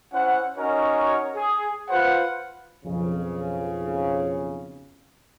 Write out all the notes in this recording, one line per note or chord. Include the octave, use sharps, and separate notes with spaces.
C#4 E4 C5 F#5
C#4 D#4 F#4 A#4 C#5 D#5
G#4
F4 B4 C5 F#5
B1 F2 C#3